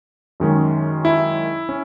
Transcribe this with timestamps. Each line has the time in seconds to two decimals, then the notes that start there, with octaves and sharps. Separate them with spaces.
0.40 F#2 D#3 G#3 C#4
1.05 E4
1.69 C#4